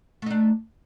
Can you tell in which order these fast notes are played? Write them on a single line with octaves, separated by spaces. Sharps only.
A3 D#4 D4